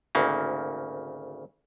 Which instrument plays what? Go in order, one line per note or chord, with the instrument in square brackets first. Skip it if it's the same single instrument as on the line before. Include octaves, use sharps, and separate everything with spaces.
[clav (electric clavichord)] G#1 D2 C#3 A#3